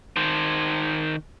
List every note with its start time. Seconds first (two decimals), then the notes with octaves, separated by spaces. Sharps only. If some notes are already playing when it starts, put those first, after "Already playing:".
0.16 D#3 C5